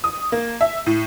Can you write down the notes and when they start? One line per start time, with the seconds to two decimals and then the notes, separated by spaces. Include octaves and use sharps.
0.04 D#6
0.32 A#3
0.61 E5
0.86 A2